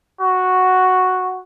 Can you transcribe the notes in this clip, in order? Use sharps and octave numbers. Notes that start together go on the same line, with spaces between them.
F#4